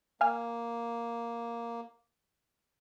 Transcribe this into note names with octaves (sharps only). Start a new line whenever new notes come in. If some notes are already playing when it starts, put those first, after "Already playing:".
A#3 F5 G#5 F6